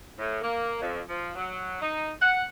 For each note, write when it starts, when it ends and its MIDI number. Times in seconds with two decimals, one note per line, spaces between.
0.18 0.38 45
0.41 0.78 58
0.80 0.99 41
1.08 1.32 53
1.34 1.80 54
1.81 2.11 63
2.20 2.43 78